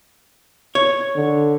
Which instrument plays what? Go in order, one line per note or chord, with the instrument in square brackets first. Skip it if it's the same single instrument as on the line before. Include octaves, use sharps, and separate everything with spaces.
[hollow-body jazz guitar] C#5
[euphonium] D3